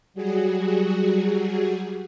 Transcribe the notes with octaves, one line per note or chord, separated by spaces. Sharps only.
F#3 G3 F#4 G#4